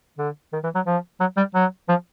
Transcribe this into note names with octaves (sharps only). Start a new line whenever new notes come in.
D3
D#3
E3
F#3
F3
F#3
G3
F#3
F3